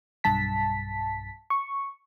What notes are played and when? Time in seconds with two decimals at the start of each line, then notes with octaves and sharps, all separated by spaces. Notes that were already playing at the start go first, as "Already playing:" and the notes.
0.24 B1 G2 A5 B6
1.50 C#6